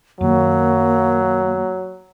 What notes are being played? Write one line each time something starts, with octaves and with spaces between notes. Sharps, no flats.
F#2 D#3 F#3 A#3